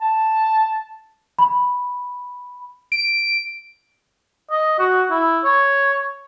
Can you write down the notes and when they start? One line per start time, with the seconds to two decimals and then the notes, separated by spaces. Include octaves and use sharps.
0.01 A5
1.39 B5
2.92 D7
4.51 D#5
4.79 F#4
5.11 E4
5.44 C#5